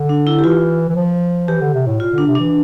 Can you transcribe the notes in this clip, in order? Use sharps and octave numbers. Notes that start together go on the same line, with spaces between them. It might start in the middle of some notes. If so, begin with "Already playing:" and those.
Already playing: D3
D4
E4
G4
E3 F4
E3
F3
E3 G4
D3
C3
A2
A#2 F4
D3 D4
C3
E3 D4